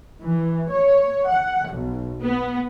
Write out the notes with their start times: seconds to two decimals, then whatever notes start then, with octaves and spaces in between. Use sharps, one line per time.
0.20 E3
0.69 C#5
1.27 F#5
1.70 B1
2.23 B3